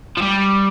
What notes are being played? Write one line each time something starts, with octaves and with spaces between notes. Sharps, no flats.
F3
G3